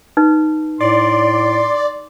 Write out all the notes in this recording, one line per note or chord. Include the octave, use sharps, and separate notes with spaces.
D#4 B4
A2 D5 C6